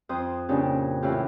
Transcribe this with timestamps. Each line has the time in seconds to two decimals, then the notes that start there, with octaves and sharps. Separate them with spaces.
0.09 F2 C5 D#6
0.49 A#2 C#3 C#4 D4 G4
1.02 A2 E3 C#4 F4 G4